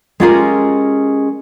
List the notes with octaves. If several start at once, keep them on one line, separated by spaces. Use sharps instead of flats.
G#3 C#4 F4 G4 G#4 A#4